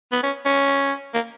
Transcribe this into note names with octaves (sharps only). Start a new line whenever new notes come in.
B3
C#4
C#4
A#3